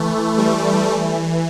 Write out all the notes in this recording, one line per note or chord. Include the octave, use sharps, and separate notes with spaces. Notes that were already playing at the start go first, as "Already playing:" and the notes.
Already playing: E3 A3
G3
E3